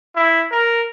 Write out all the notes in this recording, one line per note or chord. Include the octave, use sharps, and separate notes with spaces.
E4
A#4